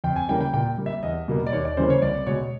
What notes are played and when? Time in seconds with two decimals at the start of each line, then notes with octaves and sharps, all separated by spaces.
0.04 F2 G5
0.16 G#5
0.29 C#3 E3 G3 A#3 G5
0.40 G5
0.53 A#2 G5
0.78 G3 A#3
0.86 E5
1.03 E2 D#5
1.28 B2 G3 A#3
1.47 D5
1.52 D#2 C#5
1.65 D5
1.77 C#3 E3 G3 A#3 C5
1.90 C#5
2.02 C2 D5
2.27 B2 G#3 C#5